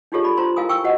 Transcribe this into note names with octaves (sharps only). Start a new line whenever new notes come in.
D4 D#4 F4 G4 A4 C#5
A4 D5 B5
D4 F4 C5 A#5 C6
E4 A#4 F5 G#5 D#6
G5 G#5 C#6 E6
F#4 C5 D#5 F#5